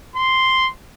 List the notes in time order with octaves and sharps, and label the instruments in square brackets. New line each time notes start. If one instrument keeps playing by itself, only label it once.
[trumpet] C6